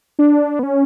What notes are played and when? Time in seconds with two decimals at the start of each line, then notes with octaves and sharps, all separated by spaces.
0.19 D4
0.59 B3
0.63 C#4